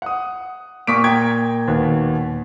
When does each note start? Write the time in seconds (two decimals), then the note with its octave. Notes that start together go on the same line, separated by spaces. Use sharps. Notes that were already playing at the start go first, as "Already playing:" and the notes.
0.02 F#5 D#6
0.87 A#2 C#6 D#6 B6 D7
1.04 G5 A#5 G#6
1.68 D#2 B2